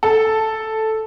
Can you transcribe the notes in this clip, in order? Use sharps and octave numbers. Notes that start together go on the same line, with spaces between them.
A4